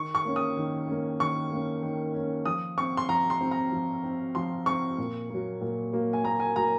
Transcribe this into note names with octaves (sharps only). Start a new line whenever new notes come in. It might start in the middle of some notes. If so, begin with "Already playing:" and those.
Already playing: D#3 C#6
C#6
A#3 C#4
D#6
D#3
A#3 C#4
D#3 C#6
A#3 C#4
D#3
A#3 C#4
F3 D#6
C4 C#6
C6
F3 A#5
C6
C4
A#5
F3
C4
F3 C6
C4 C#6
A#2
F#3 A#3
A#2
F#3 A#3
G#5
A#2 A#5
G#5
F#3 A#3 A#5